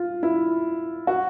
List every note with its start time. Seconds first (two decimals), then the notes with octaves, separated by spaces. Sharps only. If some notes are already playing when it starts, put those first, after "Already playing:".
Already playing: F4
0.23 E4
1.07 F#4